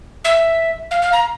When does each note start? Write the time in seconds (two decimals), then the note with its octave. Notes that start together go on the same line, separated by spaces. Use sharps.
0.25 E5
0.91 F5
1.02 F5
1.13 A#5